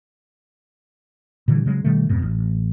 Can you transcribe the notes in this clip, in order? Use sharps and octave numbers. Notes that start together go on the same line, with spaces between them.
A#2 D3 E3 G3
C#3 F#3 G#3
B2 D#3 G3 A3
F2 G#2 B2
A1